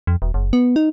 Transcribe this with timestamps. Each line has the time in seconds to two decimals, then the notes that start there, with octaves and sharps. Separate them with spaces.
0.07 F2
0.22 E1
0.34 F#1
0.53 B3
0.76 D#4